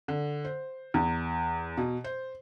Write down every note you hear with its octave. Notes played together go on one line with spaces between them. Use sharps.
D3
C5
E2
B2
C5